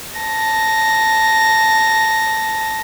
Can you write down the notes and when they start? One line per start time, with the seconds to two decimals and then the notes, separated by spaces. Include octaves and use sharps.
0.19 A5 A#6